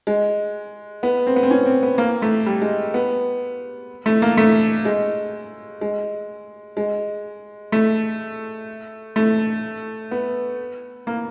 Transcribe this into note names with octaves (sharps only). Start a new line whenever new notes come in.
G#3
B3
C4
B3
C4
C#4
C4
B3
A#3
A3
G3
G#3
B3
A3
A#3
A3
G#3
G#3
G#3
A3
A3
B3
A#3